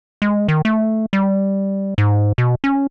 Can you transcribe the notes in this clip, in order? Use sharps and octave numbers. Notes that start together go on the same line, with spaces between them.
G#3
D#3
A3
G3
G#2
B2
C#4